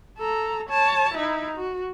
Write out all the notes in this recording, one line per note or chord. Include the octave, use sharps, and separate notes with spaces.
A4 A#5
C#5 A5
D#4 E4
F#4